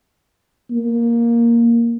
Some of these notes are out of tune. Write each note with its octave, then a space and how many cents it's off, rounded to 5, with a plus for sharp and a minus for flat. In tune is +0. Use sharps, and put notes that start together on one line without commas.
A#3 +5